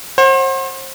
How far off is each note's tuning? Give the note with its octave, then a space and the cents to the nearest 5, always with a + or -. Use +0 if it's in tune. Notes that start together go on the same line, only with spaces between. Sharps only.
C5 +35 F#5 +0